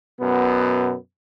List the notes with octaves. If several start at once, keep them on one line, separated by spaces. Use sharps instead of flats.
F#2 B2 B3